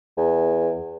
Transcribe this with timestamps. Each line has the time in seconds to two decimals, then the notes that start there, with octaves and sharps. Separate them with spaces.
0.17 E2